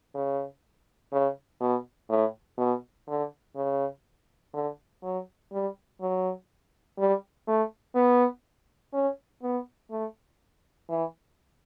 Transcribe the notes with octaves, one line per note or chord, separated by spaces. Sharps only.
C#3
C#3
B2
A2
B2
D3
C#3
D3
F#3
G3
F#3
G3
A3
B3
C#4
B3
A3
E3